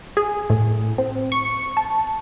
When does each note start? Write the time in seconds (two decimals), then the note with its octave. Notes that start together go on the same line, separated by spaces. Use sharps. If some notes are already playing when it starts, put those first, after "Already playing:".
0.17 G#4
0.50 A2
0.98 C4
1.32 C#6
1.77 A5